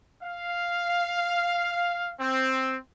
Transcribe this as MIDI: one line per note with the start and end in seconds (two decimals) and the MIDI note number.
0.23 2.12 77
2.20 2.77 60